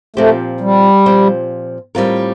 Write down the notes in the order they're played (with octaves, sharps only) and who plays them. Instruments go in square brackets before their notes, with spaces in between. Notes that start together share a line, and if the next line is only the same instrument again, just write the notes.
[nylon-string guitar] A#2 F3 C4 G4 C5 [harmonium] A3
[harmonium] G3
[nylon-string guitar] A#2 F3 C4 G4 C5
A2 G3 C4 F4 A#4